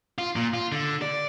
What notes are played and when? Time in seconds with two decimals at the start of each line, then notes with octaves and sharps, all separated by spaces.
0.18 F4
0.36 A#2
0.54 F4
0.72 D3
1.02 D5